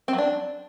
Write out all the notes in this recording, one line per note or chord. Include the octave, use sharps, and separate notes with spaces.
C4
F#3
D4